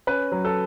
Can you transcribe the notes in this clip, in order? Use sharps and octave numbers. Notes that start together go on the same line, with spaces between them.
C#4 B4
F#3
A4